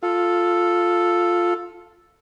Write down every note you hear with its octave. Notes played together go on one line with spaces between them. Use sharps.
F4 A4